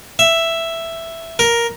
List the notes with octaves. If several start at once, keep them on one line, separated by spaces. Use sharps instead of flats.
E5
A#4